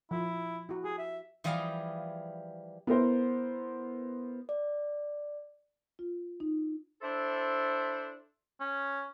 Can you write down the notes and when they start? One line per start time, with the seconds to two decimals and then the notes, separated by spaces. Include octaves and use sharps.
0.11 F3 E4
0.69 E4 F#4
0.84 G4 G#4
0.98 E5
1.44 E3 F3 G3 G#4 F5
2.87 B3 E4 A#4 C5
4.49 D5
5.99 F4
6.40 D#4
7.02 D4 E4 A4 C5
8.60 C#4